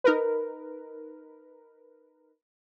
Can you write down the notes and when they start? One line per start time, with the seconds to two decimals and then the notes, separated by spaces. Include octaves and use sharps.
0.04 D#4 A#4 B4